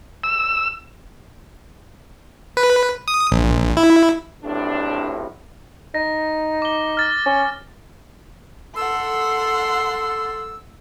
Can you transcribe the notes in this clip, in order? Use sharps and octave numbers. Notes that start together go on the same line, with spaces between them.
E6
B4
D#6
A#1
E4
B1 A2 C3 D4
D#4 A#6
D6 G7
F6 A6
C#4
A4 F#5 C6 E6